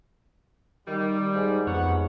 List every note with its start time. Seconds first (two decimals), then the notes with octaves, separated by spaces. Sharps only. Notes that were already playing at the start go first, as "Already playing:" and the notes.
0.88 D#3 G3
1.34 G#2
1.67 F2 G#2 B3 C#5 F#5